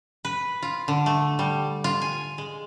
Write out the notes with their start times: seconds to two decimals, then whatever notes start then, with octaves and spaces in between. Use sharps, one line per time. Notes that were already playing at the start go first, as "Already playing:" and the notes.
0.25 B4
0.62 F4
0.88 D3
1.06 A3
1.39 G3
1.84 F4
2.02 G#5
2.38 G#3